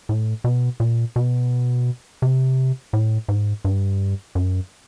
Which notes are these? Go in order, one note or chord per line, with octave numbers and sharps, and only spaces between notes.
A2
B2
A#2
B2
C3
A2
G#2
G2
F#2